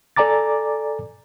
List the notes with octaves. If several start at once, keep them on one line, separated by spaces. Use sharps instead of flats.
A4 D5 G#5 A#5 D6 A6